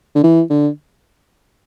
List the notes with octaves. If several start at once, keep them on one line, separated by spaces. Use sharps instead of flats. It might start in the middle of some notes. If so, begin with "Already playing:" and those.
D3
E3
D3